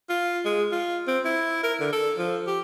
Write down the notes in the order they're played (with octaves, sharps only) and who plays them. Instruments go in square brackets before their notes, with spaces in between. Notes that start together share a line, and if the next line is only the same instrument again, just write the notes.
[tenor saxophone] F4
G#3
F4
C4
E4
A#4
D3
A4
F3
G4